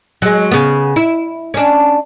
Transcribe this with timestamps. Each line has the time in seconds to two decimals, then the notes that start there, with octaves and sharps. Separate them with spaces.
0.22 F#3 G#3
0.51 C#3 B3
0.96 E4
1.54 C#4 D4